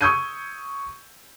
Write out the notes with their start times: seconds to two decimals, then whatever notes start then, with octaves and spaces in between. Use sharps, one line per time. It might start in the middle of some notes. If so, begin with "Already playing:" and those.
0.01 C#6 D#6 E6 G6 G#6 D#7